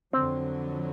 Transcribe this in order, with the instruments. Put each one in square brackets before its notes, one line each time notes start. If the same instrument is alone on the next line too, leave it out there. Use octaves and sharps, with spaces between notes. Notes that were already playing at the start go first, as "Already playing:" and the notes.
[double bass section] F2 D3 F#3 [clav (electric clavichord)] C4